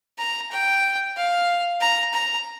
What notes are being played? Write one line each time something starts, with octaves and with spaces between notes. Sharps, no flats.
A#5
G5
F5
A#5
A#5